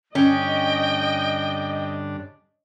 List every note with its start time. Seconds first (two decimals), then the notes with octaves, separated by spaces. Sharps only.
0.15 G2 D3 C#4 D4 D#5 G5